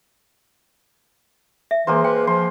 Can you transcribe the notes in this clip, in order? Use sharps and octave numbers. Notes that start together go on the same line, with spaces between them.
E5
E3 G#3 A#3 C5
B4 G5
F3 C6